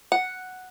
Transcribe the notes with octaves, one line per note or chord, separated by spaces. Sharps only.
F#5